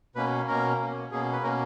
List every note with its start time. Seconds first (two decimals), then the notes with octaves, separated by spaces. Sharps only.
0.16 B2 A#3 C#4 B4
0.48 B2 A#3 C#4 A#4
0.80 B2 A#3 C#4
1.11 B2 A#3 C#4 G#4
1.33 B4
1.43 B2 A#3 C#4 A#4